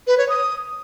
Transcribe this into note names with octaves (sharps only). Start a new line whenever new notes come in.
B4
C#5
D#6